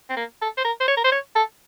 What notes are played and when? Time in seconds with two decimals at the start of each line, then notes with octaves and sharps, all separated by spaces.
0.09 C4
0.17 A#3
0.41 A4
0.57 C5
0.64 A#4
0.80 C5
0.88 C#5
0.97 A#4
1.04 C5
1.12 C#5
1.36 A4